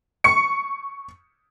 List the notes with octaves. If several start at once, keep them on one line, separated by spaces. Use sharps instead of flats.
C#6 C#7